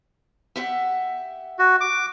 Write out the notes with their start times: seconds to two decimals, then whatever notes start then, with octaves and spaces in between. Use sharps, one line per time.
0.56 G4 E5 F#5
1.59 F#4
1.81 D6